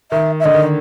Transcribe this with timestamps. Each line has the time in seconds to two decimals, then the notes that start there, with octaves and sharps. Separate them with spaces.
0.12 D#3 E5
0.40 E5
0.44 D3 D#5
0.54 D#3